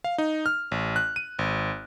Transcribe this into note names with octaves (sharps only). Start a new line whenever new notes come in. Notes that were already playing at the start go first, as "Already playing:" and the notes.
F5
D#4
F6
A1
F#6
D#7
G#1